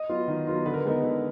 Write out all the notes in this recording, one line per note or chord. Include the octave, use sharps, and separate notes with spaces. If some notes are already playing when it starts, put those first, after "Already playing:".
Already playing: D#5
F#3 B3 F4
D#3
F#3 B3 F4
D3 B4
A#4
G#3 B3 D#4 A#4
D3